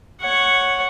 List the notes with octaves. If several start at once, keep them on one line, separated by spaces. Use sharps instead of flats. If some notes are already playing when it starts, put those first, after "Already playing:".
C#5 F#5